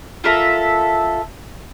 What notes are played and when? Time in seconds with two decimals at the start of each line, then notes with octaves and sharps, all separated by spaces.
0.24 F4 A4 A#4 E5